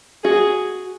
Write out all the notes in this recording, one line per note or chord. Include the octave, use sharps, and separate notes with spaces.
F#4 G#4